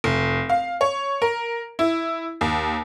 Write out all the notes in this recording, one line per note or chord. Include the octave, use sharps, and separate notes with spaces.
F1
F5
C#5
A#4
E4
D#2